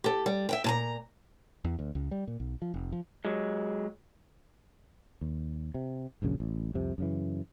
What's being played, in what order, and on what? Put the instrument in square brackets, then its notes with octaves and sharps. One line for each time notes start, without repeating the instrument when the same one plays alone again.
[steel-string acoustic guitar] G4 A4
G3
E5 F#5 G5
A#2 A5 A#5
[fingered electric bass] E2
D2
C#2
G3
A#2
B1
F3
F1
F3
[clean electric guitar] F#3 G#3
[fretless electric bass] D#2
C3
D#1 A#1 F#2 C#3
A1
C2 F2 C3
F#2 C#3 E3